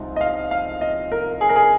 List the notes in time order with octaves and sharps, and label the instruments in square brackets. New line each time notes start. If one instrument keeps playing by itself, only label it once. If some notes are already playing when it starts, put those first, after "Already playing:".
Already playing: [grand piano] C2 C3 F3 G#3 D#4
D#5
F5
F5
D#5
A#4
G#4
A#4
G#4